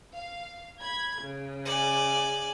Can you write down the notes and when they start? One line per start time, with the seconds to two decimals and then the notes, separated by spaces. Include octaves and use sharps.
0.14 F5
0.81 B5 G#6
1.21 C#3
1.65 D5 G#5